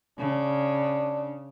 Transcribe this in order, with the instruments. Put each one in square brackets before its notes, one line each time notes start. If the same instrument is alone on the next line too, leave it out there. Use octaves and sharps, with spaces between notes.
[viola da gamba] C#3 [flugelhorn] D4